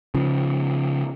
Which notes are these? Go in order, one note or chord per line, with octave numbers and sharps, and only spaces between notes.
C#3 F3